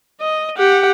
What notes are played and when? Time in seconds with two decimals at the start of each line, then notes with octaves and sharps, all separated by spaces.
0.21 D#5
0.57 G4 F#5